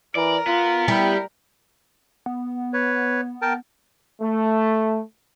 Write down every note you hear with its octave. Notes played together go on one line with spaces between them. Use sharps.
E3 A#4 D5
B3 F4
G3 E4
B3
B4 C#5
A#4 G5 A5
A3